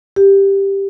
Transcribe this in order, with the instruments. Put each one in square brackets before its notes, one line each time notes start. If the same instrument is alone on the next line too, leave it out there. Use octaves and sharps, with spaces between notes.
[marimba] G4